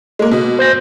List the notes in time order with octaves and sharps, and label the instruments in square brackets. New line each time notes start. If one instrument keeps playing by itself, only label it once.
[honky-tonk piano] G#3 A#3
B2
[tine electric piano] C5 G6 A#6